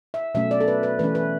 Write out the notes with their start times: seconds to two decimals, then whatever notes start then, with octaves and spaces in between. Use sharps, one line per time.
0.14 E5
0.35 B2 F#3 A3 C#4 E5
0.51 D5
0.60 A4
0.68 B4
0.83 B4
0.99 E3 A3 C#4 B4
1.15 B4